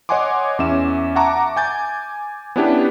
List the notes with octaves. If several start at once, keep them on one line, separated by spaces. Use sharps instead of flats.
C#5 D#5 F#5 G#5 C6 D6
E2 C#4 E5 E7
E5 F#5 A5 A#5 C#6 D6
G#5 G6 A6
B3 C#4 D4 E4 G4 B4